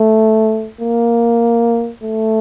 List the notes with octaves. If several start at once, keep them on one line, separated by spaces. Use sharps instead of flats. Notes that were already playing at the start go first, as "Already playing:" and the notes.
Already playing: A3
A#3
A3